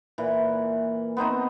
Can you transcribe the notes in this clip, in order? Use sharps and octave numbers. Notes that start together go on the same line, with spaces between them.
A#2 E3
B3 C4 D#4 D#5